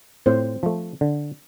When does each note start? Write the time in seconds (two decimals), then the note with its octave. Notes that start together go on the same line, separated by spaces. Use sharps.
0.26 A2 C4 C5
0.63 F3 A3
1.01 D3